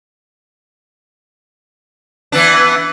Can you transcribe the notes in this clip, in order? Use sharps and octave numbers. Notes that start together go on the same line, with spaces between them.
E3 B3 D4